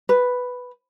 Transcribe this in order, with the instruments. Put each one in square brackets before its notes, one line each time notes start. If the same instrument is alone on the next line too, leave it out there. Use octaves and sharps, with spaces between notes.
[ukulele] B4